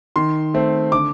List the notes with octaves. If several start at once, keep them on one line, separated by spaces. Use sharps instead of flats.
D#3 C6
A3 C4
D3 D6